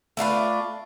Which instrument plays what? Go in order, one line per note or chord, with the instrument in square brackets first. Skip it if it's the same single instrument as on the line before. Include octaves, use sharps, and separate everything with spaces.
[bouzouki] A3 D4 F4 B4